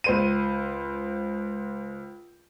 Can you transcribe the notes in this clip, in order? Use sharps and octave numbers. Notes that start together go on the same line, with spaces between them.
C#2 C5 D#7